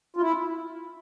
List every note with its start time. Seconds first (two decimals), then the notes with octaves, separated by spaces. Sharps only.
0.16 F4
0.21 E4